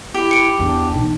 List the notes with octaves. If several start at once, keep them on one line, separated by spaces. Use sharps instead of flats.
E4 G4
C#7 D7
E2 D4
B1 E3